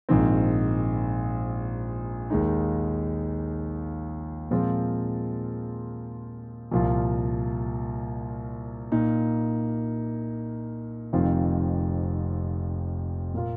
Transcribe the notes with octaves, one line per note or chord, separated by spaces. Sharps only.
A#1 G#2 D#3 C4
D#2 D#3 G#3 D#4
A#2 F3 G#3 C4 F4
C2 A#2 F3 A#3 F4
A#2 A#3 D#4
F1 F2 D#3 C4 F4
A#2 A#3 F4